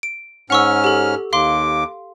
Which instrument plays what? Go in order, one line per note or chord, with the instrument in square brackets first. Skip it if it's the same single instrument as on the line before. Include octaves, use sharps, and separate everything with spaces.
[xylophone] D7
[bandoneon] G#2 C#4 F6 [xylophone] F#5 C#6 E6
[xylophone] G4 A4
[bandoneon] D#2 D6 [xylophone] F5 C6